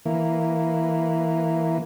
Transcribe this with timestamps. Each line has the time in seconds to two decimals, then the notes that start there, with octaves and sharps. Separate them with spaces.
0.05 E3 A#3